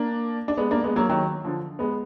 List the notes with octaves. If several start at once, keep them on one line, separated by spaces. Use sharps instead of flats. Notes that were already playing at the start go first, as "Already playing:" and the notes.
Already playing: A#3 D4
D4
G#3 B3
A#3 D4
G#3 B3
F#3 A#3
D#3 F#3
D3 F3
G#3 B3